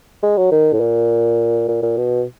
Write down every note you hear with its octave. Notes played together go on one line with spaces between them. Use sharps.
G#3
F#3
D#3
A2
A#2
A#2
A#2
B2